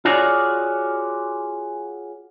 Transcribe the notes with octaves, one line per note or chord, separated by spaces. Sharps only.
F4 F#4 G#4 C#5 D5